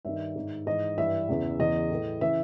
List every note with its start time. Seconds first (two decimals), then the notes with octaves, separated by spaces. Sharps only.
0.05 G2 D#3 E5
0.35 G#2 D#3
0.67 G#2 E3 D#5
0.97 G2 E3 E5
1.29 E2 C#3 E3
1.60 E2 C#3 E3 D#5
1.90 A2 E3
2.21 C#3 E3 E5